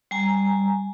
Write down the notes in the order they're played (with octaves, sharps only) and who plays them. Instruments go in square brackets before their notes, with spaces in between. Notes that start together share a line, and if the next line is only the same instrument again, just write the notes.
[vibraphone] G3 G#5 A#5